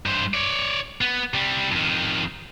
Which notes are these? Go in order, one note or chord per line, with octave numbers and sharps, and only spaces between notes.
G2 C5
C#5 D5
B3
C3 G3
F2 D#3